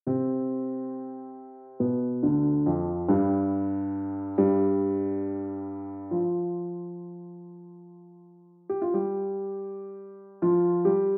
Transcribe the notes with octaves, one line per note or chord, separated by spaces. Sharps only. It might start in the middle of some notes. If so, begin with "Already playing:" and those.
C3 C4
B2 B3
D2 D3
F2 F3
G2 G3
G2 G3
F3 F4
G4
F4
G3 G4
F3 F4
G3 G4